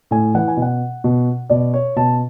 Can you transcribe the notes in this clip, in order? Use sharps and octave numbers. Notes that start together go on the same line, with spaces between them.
A2 G#5
E3 F#5
G#5
B2
F#5
B2
B2 D5
C#5
B2 A5